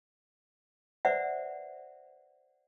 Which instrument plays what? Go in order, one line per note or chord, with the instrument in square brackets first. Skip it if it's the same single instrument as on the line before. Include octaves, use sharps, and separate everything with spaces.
[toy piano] B4 C5 D5 E5 F#5